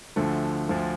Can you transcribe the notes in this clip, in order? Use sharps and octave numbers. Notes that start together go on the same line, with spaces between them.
D2 D3 F3 A3
D2 D3 F3 A3